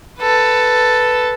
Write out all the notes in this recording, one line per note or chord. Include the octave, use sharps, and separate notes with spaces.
A4 B4